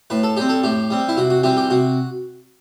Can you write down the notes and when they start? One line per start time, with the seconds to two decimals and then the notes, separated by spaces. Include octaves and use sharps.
0.10 A2 B4
0.23 A4
0.37 G3 C4 G4
0.49 A4
0.64 A2 G4
0.90 G3 C4
1.09 E4
1.17 C3 F#4
1.30 F#4
1.43 E3 G3 C4 G4
1.57 G4
1.70 C3 F#4